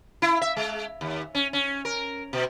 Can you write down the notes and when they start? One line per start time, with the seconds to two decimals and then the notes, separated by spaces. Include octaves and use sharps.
0.22 E4
0.42 E5
0.56 G#3
1.01 D#2
1.35 C#4
1.53 C#4
1.85 A#4
2.33 B2